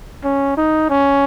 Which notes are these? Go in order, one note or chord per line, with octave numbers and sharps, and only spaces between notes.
C#4
D#4
C#4